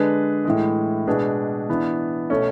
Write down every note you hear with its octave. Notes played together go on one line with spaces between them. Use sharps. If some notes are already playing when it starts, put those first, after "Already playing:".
Already playing: D3 G#3 D4 G#4 B4
A2 E3 G#3
B2 G#3 D4 G#4 B4
E3 B3 D4
B2 A3 C#4